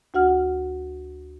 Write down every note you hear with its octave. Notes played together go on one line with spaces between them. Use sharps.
D2 F#4 F#5 F6